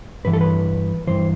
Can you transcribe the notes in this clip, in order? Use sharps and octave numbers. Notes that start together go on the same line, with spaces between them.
G2 E3 B4
A4
B4
G2 E3 C5